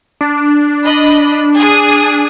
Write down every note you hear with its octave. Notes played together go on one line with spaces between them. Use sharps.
D4
D#5 B5
G#4 D#6